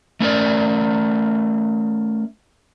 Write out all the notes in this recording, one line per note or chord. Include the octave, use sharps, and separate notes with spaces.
A3 C#4 A#4 D5